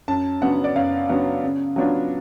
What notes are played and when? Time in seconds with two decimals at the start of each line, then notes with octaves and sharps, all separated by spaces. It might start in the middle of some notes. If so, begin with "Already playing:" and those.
0.08 F#2 A5
0.41 C#3 F#3 B3 D4 F#5
0.64 D5
0.75 F#2 F5
1.09 C#3 F#3 B3 D4
1.43 C#3
1.76 F#3 B3 D4 F4